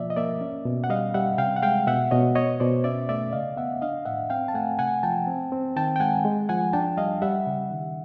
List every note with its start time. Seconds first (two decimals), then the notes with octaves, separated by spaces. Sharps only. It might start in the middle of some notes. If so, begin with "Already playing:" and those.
Already playing: B2 F3 A#3 D5 E5
0.10 D#5
0.16 A#3 D5 E5
0.41 C#4
0.65 B2
0.84 F#5
0.90 G3 D#5 F5
1.14 G3 E5 F#5
1.38 C3 F5 G5
1.56 F#5
1.62 G#3 F5 G5
1.87 B2 E5 F#5
2.11 B2 C#5 D#5
2.35 B3 C#5 D#5
2.60 B2 C5 D5
2.84 C#4 D5 E5
3.09 A3 D5 E5
3.33 C#3 D#5 F5
3.57 B3 E5 F#5
3.82 D4 D#5 F5
4.05 A2 E5 F#5
4.30 C4 F5 G5
4.48 A5
4.54 A3 F#5 G#5
4.79 C3 F#5 G#5
5.03 F3 G5 A5
5.27 C4
5.52 C4
5.76 D#3 G5 A5
5.96 G5
6.00 G#3 F#5 G#5
6.25 G#3
6.49 F3 F#5 G#5
6.73 D4 G5 A5
6.97 G3 D#5 F5
7.22 G3 E5 F#5
7.47 C#3
7.71 D#3